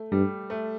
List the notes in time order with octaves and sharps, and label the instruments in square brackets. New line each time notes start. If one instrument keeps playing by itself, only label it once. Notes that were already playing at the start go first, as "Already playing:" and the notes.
Already playing: [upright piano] A3
[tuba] G2 [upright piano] G3
[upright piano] A3